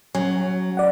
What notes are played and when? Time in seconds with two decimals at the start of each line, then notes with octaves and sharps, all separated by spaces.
0.15 F#3 C#4
0.77 D5 F#5